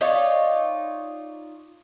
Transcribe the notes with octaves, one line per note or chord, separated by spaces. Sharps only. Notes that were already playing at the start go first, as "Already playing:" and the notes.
D#4 F4 C#5 D5